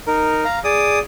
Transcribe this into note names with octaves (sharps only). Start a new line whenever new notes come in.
D#4 A#4
F5 A#5
G#4 D5 D#6